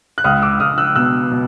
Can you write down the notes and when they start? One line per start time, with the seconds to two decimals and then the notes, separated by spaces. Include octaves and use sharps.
0.18 F#6
0.24 C#2 D#6 F6
0.42 D6 E6
0.60 C#2 D#6 F6
0.78 E6 F#6
0.95 B2 E6 F#6
1.31 B2